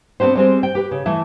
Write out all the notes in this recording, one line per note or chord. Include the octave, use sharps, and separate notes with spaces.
B3 C4 D4 G4 C5
G3 G#3 C4
G5
G4 B4
C#3
E3 A3 E4